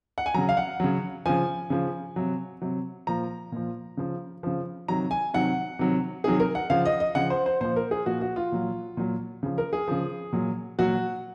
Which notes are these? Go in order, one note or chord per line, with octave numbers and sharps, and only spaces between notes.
F#5
G#5
C#3 F#3 A#5
F5
F#5
C#3 F#3
C#3 F3 G#5
C#3 F3
C3 F#3
C3 F#3
A#2 F3 A#5
A#2 F3
C#3 F3
C#3 F3
C3 D#3 F#3 A#5
G#5
C3 D#3 F#3 F#5
C3 D#3 F#3
C3 D#3 F#3 G#4
A#4
F#5
C#3 F3 F5
D#5
D#5
C#3 F3 F#5
C5
C5
A#2 F3 C5
A#4
G#4
A#2 F3 F#4
F#4
F4
A#2 F#3
A#2 F#3
C#3 F3
A#4
G#4
C#3 F3
A#2 F#3
A#2 F#3 F#4